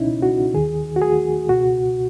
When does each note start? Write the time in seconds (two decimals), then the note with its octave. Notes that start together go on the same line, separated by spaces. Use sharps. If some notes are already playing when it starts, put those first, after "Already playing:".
Already playing: C#2 B2 C#4 D#4 E4
0.22 F#4
0.54 D#2 D#3 G#4
0.96 F#4
1.02 G#4
1.49 C#2 B2 F#4